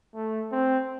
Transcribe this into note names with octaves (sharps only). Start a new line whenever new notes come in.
A3
C4